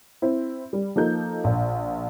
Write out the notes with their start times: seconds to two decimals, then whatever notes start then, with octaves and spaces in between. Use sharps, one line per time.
0.22 C4 E4
0.73 G3
0.96 F3 A#3 D#4 A4 G6
1.44 A#1